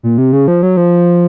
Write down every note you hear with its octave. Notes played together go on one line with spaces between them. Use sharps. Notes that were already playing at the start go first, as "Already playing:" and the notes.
A#2
C3
C#3
F3
F#3
F3